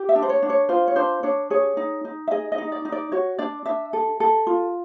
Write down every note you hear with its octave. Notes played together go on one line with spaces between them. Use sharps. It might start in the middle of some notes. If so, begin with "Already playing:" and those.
Already playing: G4
E5
D4
C5
C#5
D4
C#5
F4 C5
C#5
D4 C5
D4 C#5
G#4 C#5
D#4
D#4
E5
G#4 D#5
D#5
D#4
D5
D#4
D5
F#4 C#5
D4 D5
D4 E5
A4
A4
F4